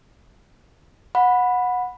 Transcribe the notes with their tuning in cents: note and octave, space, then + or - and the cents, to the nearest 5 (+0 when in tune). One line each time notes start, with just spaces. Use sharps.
F#5 -20 B5 +0